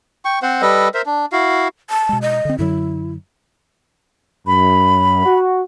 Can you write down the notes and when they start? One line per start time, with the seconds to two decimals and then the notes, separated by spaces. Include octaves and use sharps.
0.25 G5 C#6
0.42 C4 C5 F#5
0.62 G3 A4 B4 D#5
0.94 A#4 C5 E5
1.06 D4
1.32 E4 F#4 F5
1.90 A5
2.09 B2 G#3
2.22 D#5
2.45 D3 C4
2.58 F#2 D3 F#3 E4
4.47 F#2 B5
5.25 F#4